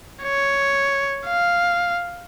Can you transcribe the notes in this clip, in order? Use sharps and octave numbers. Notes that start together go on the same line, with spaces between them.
C#5
F5